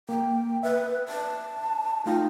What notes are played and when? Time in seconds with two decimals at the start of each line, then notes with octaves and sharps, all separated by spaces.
0.09 A#3 G5
0.63 B4 E5
1.09 A5
2.06 A3 D#4 F4 G5